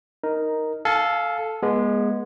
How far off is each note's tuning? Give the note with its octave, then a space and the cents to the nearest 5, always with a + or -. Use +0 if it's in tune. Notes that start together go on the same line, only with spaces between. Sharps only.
D#4 +0 A#4 +0
A4 +0 F5 +0 G#5 +40
G#3 +0 B3 -30